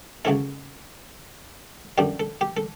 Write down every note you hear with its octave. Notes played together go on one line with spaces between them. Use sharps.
C#2 C#3 F#3 C#4 E4 A4
F#2 D3 G3 G4
A4
G4
A4